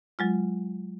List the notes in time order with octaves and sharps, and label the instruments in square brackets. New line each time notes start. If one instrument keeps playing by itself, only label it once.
[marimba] F#3 G#3 F4